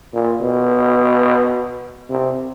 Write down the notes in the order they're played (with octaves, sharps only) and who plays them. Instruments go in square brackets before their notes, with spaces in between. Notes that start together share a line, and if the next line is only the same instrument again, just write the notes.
[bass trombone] A#2
B2
C3